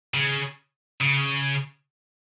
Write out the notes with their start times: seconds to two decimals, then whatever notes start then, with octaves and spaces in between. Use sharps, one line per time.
0.14 C#3
1.01 C#3